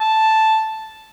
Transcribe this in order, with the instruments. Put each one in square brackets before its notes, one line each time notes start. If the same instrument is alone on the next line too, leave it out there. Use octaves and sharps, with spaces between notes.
[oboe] A5